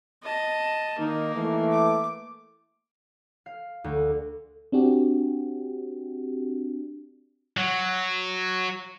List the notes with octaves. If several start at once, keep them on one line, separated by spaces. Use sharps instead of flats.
D#5 A5
D#3 A#3 D#4
E3 A3
D6
F5
D2
C4 D4 F#4 G4
F#3